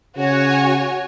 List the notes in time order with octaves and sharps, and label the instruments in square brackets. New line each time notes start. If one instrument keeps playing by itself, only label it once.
[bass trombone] C#3 [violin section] F#4 C#5 G#5